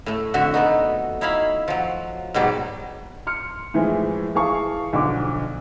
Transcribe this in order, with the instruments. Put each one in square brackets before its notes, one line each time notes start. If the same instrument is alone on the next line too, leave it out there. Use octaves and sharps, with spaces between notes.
[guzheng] A2 A3
F2 D3 F#4 E5
A3 B3 D#4
D#4 E4 C#5 E5 F5 B5
F3 F#3
G#2 B2 F#3 G3
[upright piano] C6 F6 C#7
A2 E3 F3 G#3
E3 G#4 F5 A5 C#6
B1 D3 F3 D6